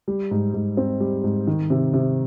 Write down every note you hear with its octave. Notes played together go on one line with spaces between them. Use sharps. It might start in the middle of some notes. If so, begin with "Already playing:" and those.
G3
G#2
G#2
C4
G3
G#2
D#3
C3
C3